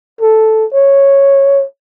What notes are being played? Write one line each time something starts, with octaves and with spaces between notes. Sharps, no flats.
A4
C#5